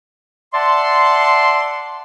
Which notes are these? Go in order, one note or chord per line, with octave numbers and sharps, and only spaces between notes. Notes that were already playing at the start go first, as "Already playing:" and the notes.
D5 E5 F#5 A5 C6